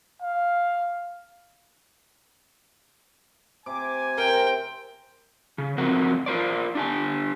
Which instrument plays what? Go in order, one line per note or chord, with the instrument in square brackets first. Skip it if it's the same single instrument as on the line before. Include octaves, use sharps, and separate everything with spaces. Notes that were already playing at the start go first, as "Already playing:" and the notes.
[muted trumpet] F5
[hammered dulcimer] C3 [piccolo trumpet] G#5 [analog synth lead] D6
[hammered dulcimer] C3 [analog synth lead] A#4 [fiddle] G5
[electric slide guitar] C#3
F3 C4 F#4 A#4 F#5
F4 A#4 C5 D5
D4 G4 G#5